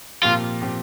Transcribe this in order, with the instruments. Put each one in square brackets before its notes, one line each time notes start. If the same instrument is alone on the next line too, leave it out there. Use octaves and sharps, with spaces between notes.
[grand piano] A#2 F3 C4 G4 [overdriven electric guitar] F4
[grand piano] A#2 F3 C4 G4